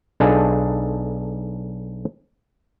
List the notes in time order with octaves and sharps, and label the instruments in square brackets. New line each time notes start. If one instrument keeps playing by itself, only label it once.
[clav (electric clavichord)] B1 D4 D#4 G#4 A4 F5